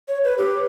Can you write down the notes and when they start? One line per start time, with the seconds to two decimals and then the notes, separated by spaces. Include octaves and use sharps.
0.08 C#5
0.24 B4
0.38 G4